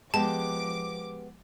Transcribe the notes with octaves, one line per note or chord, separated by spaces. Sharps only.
F3 G#3 B3 G4 A5 D6